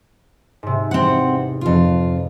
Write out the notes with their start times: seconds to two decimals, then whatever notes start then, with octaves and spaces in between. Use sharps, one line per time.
0.63 G#2 C3
0.91 E2 C4 F#5
1.61 F2 F4